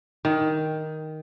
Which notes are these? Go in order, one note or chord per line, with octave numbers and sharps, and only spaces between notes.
D#3